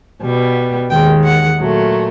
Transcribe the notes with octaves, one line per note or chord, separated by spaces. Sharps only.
B2 G3 B3
D#2 D#3 G#3 G5
F#5
A#2 F#3 A3